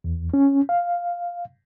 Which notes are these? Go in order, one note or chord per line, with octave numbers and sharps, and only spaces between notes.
E2
C#4
F5